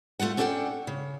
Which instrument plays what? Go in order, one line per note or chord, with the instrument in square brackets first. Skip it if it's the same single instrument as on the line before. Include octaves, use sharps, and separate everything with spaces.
[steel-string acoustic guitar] A3 F4 F#4 F#5
C#4 D4 A4 C#5 F#5 G5
C#3